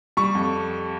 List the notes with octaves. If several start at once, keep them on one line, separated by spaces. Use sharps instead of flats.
G3 C#6
F2